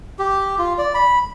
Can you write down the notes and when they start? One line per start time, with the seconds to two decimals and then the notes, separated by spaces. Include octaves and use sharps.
0.19 G4
0.58 F4
0.78 D5
0.94 B5